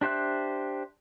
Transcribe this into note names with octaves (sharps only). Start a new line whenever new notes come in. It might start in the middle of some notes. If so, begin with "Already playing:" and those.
D4 G4 C5 E5 F#6